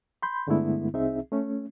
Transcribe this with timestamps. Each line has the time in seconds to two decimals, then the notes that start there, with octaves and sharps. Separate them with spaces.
0.23 B5 C6 G6
0.47 G2 D3 G#3 A3 B3 E4
0.94 C2 C4 D#4 G#4 E5
1.32 A3 C#4